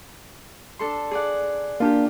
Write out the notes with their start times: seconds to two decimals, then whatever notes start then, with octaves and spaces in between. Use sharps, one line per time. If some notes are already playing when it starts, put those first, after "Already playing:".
0.79 D4 A4 C6
1.11 G#4 D5 F#5
1.80 A#3 D4 F4 G4